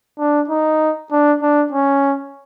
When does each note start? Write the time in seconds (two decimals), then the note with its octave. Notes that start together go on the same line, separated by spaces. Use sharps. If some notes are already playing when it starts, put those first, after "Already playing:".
0.19 D4
0.50 D#4
1.12 D4
1.42 D4
1.73 C#4